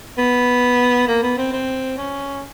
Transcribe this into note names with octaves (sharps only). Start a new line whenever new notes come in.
B3
A#3
B3
C4
C4
C#4